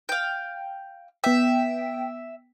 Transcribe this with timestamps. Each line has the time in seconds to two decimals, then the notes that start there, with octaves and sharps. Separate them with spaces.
0.09 F5 G5
1.24 B3 E5 G5